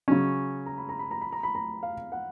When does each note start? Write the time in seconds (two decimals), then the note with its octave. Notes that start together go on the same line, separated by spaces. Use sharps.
0.08 C#3 F#3 C#4 G#5
0.66 A#5
0.77 B5
0.89 A#5
0.99 B5
1.11 A#5
1.21 B5
1.32 A#5
1.43 B5
1.55 A#5
1.83 F5
2.12 F#5